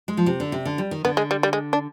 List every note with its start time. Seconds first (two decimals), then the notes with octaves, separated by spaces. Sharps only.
0.08 G#3
0.17 F3
0.26 C3
0.40 D3
0.52 C3
0.65 D3
0.78 G3
0.91 D#3
1.05 D3 B3
1.17 G#3
1.31 G3
1.43 G3
1.53 G#3
1.73 D4